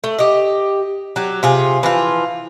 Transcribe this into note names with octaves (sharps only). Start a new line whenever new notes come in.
A3
G4 D#5
F#3 G4
C3 F4 G#4
E3 F3 F4